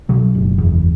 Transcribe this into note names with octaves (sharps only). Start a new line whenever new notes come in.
B2 F#3
F#1
E2